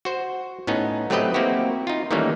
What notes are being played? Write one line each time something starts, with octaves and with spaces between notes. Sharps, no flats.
F#4 C5
A2 B3 C#4 D#4
F#3 A3 C4 G4 B4 D#5
A#3 C4 E4 F#4 G4
D#4 F4
D#3 E3 G3 A3 A#3 C#4